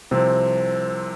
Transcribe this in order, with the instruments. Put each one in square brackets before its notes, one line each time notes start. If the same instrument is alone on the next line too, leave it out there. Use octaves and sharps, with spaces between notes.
[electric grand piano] C2 C3 F3 C4